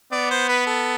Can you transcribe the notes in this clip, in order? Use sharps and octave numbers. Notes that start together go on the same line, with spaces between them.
B3 D5
C5
B4
A4